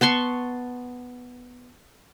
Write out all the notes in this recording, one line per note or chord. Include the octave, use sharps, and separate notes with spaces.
B3 A5 C6 C#6